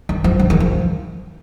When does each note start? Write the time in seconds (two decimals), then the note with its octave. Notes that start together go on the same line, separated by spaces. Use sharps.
0.09 D#3
0.24 F3
0.40 D3
0.50 D#3
0.60 F3